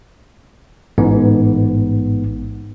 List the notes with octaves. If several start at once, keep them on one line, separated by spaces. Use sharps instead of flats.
A1 G#2 B3